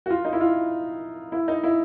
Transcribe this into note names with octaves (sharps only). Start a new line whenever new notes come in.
F#4
F4
D#4
E4
F4
E4
D#4
E4